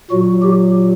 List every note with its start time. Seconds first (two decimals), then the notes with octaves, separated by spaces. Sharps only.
0.11 A#2 F#3 F#4
0.42 G4